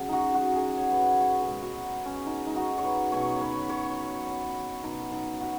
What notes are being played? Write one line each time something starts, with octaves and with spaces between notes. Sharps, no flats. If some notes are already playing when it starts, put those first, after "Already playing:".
Already playing: C#3 F#3
D#4 F#4
F#4
G#4
C#5
B4
C#5
C#5
B2 G#3 G#4
F#4
C#4
D#4
D#4
F#4
C#5
B4
B2 F#3 C#5
B4 C#5
C#5
B2 F#3 D#4
D#4
F#4